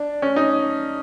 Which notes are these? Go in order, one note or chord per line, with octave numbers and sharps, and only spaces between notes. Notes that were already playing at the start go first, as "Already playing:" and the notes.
Already playing: D4
C#4
D#4